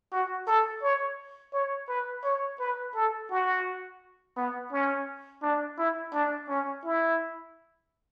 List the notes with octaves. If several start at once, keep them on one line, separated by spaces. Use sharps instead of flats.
F#4
A4
C#5
C#5
B4
C#5
B4
A4
F#4
B3
C#4
D4
E4
D4
C#4
E4